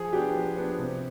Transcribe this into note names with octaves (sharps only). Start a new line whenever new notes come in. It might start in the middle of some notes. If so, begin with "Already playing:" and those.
Already playing: F3 G#4
B3 D4 G4
F3
B3 D4
C3